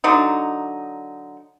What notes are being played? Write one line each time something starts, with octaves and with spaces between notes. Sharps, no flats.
D3 F#3 D#4